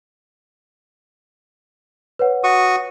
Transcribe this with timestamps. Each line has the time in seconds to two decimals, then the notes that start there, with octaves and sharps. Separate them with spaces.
2.19 B4 C#5 F#5
2.44 F#4 C#6 D#6